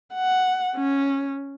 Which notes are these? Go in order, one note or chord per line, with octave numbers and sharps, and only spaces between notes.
F#5
C#4